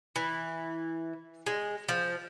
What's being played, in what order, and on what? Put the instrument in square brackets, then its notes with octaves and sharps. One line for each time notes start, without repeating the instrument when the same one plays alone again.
[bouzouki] E3
G#3
F3